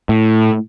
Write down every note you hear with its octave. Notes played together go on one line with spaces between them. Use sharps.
A2